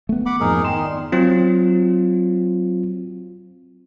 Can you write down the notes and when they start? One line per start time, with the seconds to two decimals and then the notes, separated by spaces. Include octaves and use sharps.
0.09 A3 B3
0.26 F#5 B5 D6
0.40 F2 G#2 D#4 G#4 A#4
0.64 D#3 G5 C6 E7
0.84 D5
1.12 F#3 C4 F4